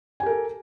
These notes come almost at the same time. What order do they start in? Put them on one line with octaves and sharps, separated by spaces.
G#5 G4 A#4 A4